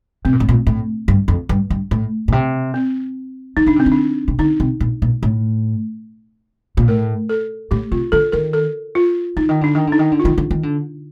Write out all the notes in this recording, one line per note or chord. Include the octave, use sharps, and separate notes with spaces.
C3 C4
A#2
A2
A#2
A2
G2
F2
G2
G2
A2
A#2
C3
C4
D#3 D#4
D3 D4
C3 C4
D3
D4
C3
D3 D#4
C3
A#2
A#2
A2
A#2
A2 A#4
A4
A2 G4
C3 F4
D3 A4
D#3 A#4
A4
F4
D3 D#4
D#3
D3 D4
D#3
D3
D#4
D#3
D3
F4
D#3
D3
D#3
D3